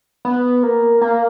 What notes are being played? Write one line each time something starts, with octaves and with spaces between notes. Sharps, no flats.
B3
A#3
A#3